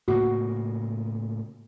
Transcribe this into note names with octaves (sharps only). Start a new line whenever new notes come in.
A2 C#3 A#3 F#4